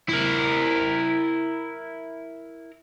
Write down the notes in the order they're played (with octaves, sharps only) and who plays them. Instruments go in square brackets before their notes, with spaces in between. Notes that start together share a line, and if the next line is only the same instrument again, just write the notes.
[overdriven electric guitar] E4 A#4